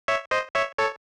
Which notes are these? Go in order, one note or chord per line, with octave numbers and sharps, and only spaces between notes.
C#5 E5
C5 D#5
C#5 E5
A4 C#5